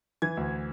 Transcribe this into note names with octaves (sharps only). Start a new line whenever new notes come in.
E3 G#6
D2